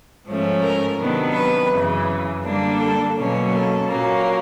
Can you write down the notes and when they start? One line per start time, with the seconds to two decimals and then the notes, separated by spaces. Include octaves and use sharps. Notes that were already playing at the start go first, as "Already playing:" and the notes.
0.26 G#2 F3 A3 C#4
0.62 A#4
0.98 C3 D#3 F#3 B3 D4
1.35 B4
1.71 F#2 C#3 E3
2.44 D3 G3 A#3 D4
2.79 A4
3.16 B2 F#3 A#3 C#4
3.52 A4
3.88 A#2 F#3 A#3 C#4